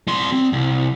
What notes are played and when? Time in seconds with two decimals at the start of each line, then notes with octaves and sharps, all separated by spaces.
0.08 G3 C6
0.32 C4
0.53 C2